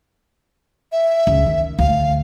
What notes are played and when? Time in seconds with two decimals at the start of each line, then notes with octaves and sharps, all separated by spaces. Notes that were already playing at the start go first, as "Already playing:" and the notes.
0.92 E5
1.27 C#2
1.46 D#3
1.79 D2 F5